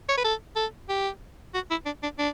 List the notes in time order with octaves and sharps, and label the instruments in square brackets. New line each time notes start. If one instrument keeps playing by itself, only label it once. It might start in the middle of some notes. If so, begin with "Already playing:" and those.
[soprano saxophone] C#5
B4
A4
A4
G4
F#4
E4
D4
D4
D4